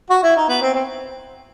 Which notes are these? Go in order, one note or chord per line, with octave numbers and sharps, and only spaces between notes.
F#4
E4
D#4
B3
C4
C4